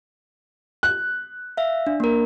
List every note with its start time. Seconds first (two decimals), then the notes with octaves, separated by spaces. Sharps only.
0.83 F#6
1.57 E5 F5
1.87 D4
2.00 A#3 A#4